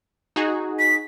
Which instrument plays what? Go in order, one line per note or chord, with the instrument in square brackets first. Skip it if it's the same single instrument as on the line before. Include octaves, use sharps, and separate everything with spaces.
[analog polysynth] D#4 F#4 G#4
[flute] B6